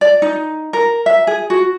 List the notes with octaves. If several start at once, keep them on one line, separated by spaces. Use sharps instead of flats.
D5
D#4
A#4
E5
G#4
F#4